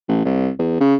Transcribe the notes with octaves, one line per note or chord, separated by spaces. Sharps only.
A1
C2
E2
C#3